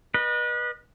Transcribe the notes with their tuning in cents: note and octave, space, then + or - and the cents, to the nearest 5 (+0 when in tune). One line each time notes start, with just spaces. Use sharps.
B4 -30 D#5 -40